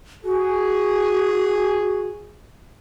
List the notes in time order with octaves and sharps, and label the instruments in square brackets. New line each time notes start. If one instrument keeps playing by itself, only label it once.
[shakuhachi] F#4 [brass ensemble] G#4